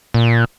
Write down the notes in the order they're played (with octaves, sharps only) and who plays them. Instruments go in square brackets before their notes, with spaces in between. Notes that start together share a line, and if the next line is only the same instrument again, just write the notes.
[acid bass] A#2